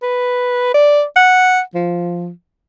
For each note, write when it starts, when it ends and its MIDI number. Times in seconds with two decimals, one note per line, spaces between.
0.03 0.73 71
0.74 1.03 74
1.16 1.61 78
1.74 2.30 53